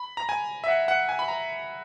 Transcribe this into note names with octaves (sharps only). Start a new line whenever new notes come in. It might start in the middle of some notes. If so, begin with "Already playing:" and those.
Already playing: B5
A#5
G#5
E5
F#5
F#5
G#5
B5
A#5